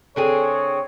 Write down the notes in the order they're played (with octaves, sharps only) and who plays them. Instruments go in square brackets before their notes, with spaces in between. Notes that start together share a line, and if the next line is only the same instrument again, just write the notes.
[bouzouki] D3 C4 G#4 [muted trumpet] C#5